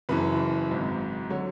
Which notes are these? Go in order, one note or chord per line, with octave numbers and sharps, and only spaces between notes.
F#1 F#2 E3 B4
G#1 G#2 F#3
D3 F#3 C#5